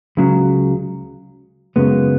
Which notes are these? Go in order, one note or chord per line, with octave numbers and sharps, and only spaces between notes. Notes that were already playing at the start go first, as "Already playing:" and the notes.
C#2 C#3 F#3
F#2 C#3 G#3 B3